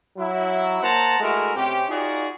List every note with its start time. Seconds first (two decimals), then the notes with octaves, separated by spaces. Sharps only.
0.17 F#3 E4
0.82 A#3 C5 F#5 A5 A#5
1.20 G#3 A3 E4 F#4 A#4
1.56 C3 C4 C#4 G4
1.89 D#4 F4 F#4 G#4 D5